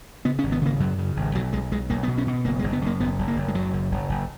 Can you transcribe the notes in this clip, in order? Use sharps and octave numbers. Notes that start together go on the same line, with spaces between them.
C#3 B3
C#4
G#1
B3
C#3 A#3
F#2 F#3
C#3
G#1
B1 F#3
B1 G#3
B1 G#3
B1 A#3
B3
B2
C#4
B2
F#1 A#3
G#3
F#1
B3
F#2 A#3
F#1 B3
F#1
A#3
F#1
G#3
F#2 F#3
F#1
F#1
F#1